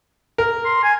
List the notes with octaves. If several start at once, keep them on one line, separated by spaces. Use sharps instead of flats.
A#4
C6
G#5